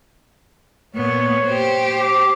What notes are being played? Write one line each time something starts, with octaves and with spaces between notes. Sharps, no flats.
A#2 B3 C#5
G4 C5
D6